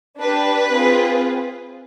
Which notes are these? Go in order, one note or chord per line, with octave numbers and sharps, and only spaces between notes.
D4 G4 B4
C4 F4 G#4